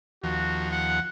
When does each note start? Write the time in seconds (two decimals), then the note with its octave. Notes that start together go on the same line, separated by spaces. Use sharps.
0.23 D#2 F3 F#4
0.71 F#5